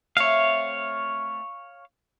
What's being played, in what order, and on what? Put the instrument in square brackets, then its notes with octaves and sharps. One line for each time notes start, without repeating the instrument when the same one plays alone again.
[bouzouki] A3 C4 E5 [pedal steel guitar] C#5 F5